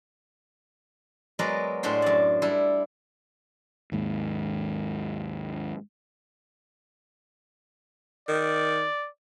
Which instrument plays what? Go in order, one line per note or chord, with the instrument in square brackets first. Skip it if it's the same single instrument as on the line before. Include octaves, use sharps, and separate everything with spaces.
[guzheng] F#3 G#3 B3 A#4 D5
A2 G#3 D4 G4 C5
F#2 D5
G3 D4 E4
[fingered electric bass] D#2 G#2
[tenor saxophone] D#3 [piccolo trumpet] D5